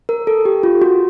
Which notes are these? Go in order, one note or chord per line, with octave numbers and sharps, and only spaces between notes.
A#4
A4
G4
F4
F#4